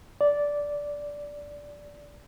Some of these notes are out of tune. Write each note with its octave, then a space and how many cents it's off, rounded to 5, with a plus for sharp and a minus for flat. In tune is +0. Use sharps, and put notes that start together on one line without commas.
D5 -10